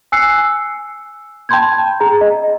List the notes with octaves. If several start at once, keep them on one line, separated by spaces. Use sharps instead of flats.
G#5 E6 F#6 C7 C#7
G5 A5 B5 C6 G6 G#6
G#4 A#5
D#5